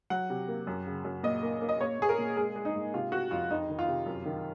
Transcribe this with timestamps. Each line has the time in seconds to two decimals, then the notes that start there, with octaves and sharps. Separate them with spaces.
0.10 F#3 F#5
0.30 C3
0.48 A#3
0.67 F#2
0.86 C#3
1.05 F#2
1.23 A#2 D#5
1.43 A#3
1.61 A#3
1.69 D#5
1.80 A#2 C#5
1.99 A#2 G#4
2.09 A#4
2.18 A#2
2.36 G#3 G#4
2.56 G#3
2.65 D#4
2.75 G#2
2.94 C3 F4
3.12 C3 F#4
3.31 F2 F4
3.50 F2 D#4
3.69 D#3
3.79 F4
3.88 C3
4.06 F#2
4.25 D#3